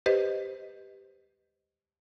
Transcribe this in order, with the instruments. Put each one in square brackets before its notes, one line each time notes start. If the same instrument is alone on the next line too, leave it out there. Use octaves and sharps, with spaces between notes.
[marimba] G4 B4 C5 D#5